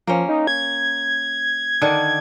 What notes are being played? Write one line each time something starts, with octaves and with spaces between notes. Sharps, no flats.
F3 A#3 C#4
D#4
G#6
D3 D#3 D4